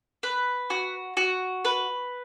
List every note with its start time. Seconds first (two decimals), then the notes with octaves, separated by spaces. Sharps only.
0.23 B4
0.70 F#4
1.17 F#4
1.65 B4